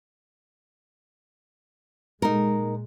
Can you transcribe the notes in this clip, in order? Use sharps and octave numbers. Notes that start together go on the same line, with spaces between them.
A#2 G#3 D#4 A#4